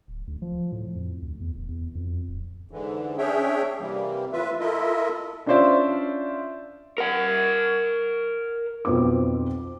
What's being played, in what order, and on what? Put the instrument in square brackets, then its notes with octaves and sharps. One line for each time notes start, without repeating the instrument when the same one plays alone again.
[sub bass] D1
D2
F3
A2
F2
D2
E2
D#1
E2
F2
D1
[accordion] G#2 D3 E3
C#4 D4 G#4 C#5 E5 G5
C3 E3 G3 A#3
A2 E3 F4 B4 E5
E4 F4 A4 A#4 D#5 E5
[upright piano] C#4 D4 F4 C5 D5 E5
[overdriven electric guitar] A#4 F#5
[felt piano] B1 F2 C4 B4 D6